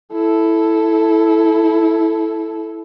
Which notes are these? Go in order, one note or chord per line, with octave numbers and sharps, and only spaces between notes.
E4 A4